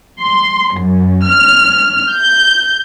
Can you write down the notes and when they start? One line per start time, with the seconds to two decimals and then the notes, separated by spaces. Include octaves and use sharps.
0.18 C6
0.75 F#2
1.26 F6
2.14 G6